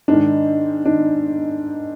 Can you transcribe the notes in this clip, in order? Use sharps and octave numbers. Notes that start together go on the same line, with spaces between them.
G#2 D#3 D4
D#3 D4